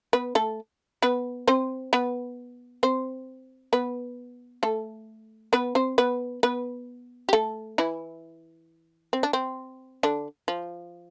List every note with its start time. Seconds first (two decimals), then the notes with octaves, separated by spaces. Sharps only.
0.13 B3 B4
0.35 A3 A4
1.02 B3 B4
1.47 C4 C5
1.93 B3 B4
2.83 C4 C5
3.73 B3 B4
4.63 A3 A4
5.53 B3 B4
5.75 C4 C5
5.98 B3 B4
6.43 B3 B4
7.29 G4
7.33 A3 A4
7.78 E3 E4
9.13 C4
9.23 D4
9.33 C4
10.03 D3 D4
10.48 F3